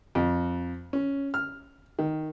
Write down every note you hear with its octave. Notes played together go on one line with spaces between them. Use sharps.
F2
C#4
F6
D#3